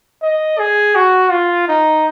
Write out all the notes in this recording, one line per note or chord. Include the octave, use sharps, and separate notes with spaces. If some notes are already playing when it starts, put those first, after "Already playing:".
D#5
G#4
F#4
F4
D#4